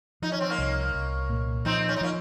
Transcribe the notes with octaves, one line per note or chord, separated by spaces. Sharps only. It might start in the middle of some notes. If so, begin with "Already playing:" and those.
F3 D#4
C#4
C4
A#3 C#4
C2
C2
A#2
F3 C4 D#4
C#4
D#4
F3 A#3 C#4